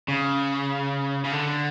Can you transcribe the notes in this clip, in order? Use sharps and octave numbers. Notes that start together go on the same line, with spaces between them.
C#3
C#3
D3